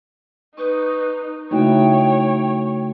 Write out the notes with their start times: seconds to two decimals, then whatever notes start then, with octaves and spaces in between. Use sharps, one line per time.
0.57 D#4 B4 C#6 D#6 G6
1.51 C#3 A3 D#4 E4 F#4 C#5 G5